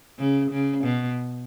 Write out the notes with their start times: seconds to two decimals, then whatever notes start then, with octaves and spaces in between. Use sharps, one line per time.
0.18 C#3
0.51 C#3
0.84 B2